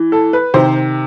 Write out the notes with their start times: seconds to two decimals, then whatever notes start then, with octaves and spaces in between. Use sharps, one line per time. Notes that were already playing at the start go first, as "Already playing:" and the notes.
Already playing: E3
0.12 A4
0.33 B4
0.54 C3 D#3 C5